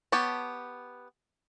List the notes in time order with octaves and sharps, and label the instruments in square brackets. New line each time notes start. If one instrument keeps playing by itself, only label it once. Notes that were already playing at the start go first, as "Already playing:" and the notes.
[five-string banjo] B3 G4 C#5 A5